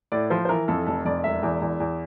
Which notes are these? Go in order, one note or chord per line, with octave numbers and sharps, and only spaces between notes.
A2 D5
F3 C5
C5
E3 A#4
F2 A4
F1 A4
F2 D5
E1 E5
E2
E2
E2